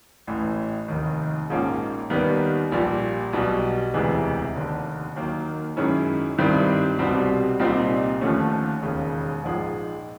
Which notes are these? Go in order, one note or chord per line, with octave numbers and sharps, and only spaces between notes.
A1 A2 E3
F1 D#2 D#3
A#1 G#2 F3 A#3 C#4
D#2 D#3 G3 B3
A#1 A#2 G3
B1 B2 G3
E1 D2 C3 E3 G#3
F1 D#2 D3
D#2 D#3 F#3 A#3
F#2 D#3 G#3 C#4 E4
G2 D#3 G3 C4 E4
C2 B2 G3 C4
C2 A#2 G3 C4 D#4
D#2 D3 F3 A3 C#4
E1 D#2 C#3
A#1 G#2 F3 G#3